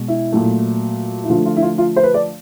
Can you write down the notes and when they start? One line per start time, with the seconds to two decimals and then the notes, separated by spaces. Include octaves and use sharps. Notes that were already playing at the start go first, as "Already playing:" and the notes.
Already playing: B2 G#3
0.08 E4
0.32 A#2 F#3 A3
1.24 E4
1.29 D3 F3 A3 F4
1.46 F4
1.56 E4
1.62 F4
1.78 F4
1.96 C5
2.03 B4
2.14 D5